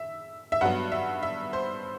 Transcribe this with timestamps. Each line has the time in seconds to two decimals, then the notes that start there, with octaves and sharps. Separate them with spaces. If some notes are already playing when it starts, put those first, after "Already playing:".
Already playing: E5
0.52 E5
0.61 G2 F#3 B3 F#5
0.92 E5
1.23 E5
1.53 C5